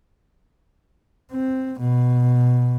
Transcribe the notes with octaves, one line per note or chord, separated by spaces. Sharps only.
C4
B2